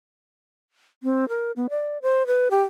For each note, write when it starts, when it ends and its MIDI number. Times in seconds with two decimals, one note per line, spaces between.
1.03 1.28 60
1.29 1.52 70
1.56 1.67 59
1.70 1.98 74
2.02 2.26 72
2.27 2.48 71
2.51 2.61 67